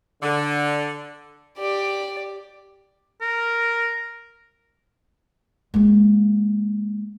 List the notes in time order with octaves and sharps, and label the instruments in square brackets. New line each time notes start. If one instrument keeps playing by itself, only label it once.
[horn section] D3
[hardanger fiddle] G4 D5
[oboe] A#4
[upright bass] G#3 A#3